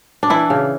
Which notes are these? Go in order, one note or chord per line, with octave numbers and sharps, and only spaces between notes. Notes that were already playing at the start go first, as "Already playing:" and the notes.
D4
E3 E4
C#3